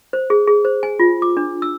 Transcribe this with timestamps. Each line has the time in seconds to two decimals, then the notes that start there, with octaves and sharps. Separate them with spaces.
0.13 C5
0.30 G#4
0.47 G#4
0.65 C5
0.83 G#5
0.99 F4
1.22 D6
1.37 D4
1.62 E6